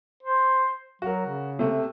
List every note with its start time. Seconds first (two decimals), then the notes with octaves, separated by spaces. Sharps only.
0.23 C5
1.02 F#3 F#4 A#4
1.26 C#3
1.59 C3 A3